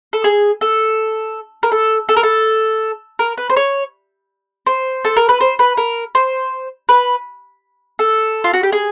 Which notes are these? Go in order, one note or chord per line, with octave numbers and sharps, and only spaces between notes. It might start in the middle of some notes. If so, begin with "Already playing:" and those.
A4
G#4
A4
A#4
A4
A4
A#4
A4
A#4
B4
C5
C#5
C5
A4
A#4
B4
C5
B4
A#4
C5
B4
A4
F4
F#4
G4
G#4